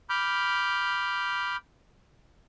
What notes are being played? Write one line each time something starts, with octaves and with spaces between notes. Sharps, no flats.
B5 D6 F6 G6